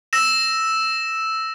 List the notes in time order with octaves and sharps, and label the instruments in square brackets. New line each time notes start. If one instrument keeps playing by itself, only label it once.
[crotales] E6 A#6 E7